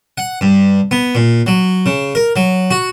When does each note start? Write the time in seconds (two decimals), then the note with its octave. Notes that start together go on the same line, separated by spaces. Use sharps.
0.18 F#5
0.41 G2
0.91 B3
1.15 A#2
1.47 F#3
1.86 C#3
2.15 A#4
2.36 F#3
2.71 F#4